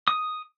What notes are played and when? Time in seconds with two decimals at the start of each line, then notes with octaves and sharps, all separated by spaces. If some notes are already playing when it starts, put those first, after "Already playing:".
0.08 D#6